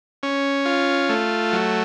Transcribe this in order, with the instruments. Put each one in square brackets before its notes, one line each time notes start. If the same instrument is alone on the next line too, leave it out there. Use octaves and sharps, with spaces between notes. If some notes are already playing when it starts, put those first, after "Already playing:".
[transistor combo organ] C#4
F4
A3
F#3